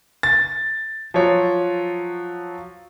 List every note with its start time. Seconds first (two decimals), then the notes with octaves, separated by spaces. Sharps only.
0.23 A6
1.14 F3 F#3 C#5